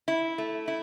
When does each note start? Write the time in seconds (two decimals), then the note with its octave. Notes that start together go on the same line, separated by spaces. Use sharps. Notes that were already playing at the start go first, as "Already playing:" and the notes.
0.08 E4
0.38 A3
0.68 E4